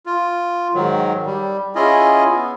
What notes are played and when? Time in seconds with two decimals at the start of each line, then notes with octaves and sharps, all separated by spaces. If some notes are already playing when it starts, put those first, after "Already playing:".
0.06 F4
0.74 G#2 D#3 F#3
1.26 G3
1.75 C#4 E4 F4 G#4 D#5
2.29 B3